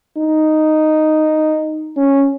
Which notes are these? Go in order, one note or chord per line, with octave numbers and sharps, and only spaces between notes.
D#4
C#4